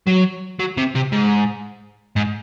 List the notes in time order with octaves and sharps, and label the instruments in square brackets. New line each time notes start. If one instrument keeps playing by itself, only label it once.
[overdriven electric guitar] F#3
F#3
C3
C3
G#2
G#2